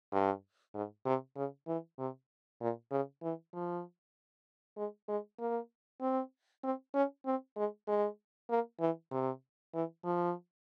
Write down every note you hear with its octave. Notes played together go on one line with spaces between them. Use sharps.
G2
G#2
C3
C#3
E3
C3
A#2
C#3
E3
F3
G#3
G#3
A#3
C4
C4
C#4
C4
G#3
G#3
A#3
E3
C3
E3
F3